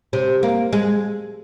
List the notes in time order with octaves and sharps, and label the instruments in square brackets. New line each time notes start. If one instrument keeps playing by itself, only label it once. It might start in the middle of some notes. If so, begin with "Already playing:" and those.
[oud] C3
A#3
G#3